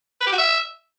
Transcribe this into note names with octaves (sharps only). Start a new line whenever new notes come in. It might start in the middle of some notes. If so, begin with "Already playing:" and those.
B4
G4
F#4
E5